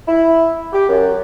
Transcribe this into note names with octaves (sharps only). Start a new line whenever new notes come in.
E4
G4
F#2